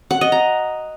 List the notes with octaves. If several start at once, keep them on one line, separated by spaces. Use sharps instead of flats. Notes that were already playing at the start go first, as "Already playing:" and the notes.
F#5
D#5
A#5